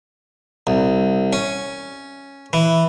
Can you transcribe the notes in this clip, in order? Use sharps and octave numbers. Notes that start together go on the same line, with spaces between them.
C2
C#4
E3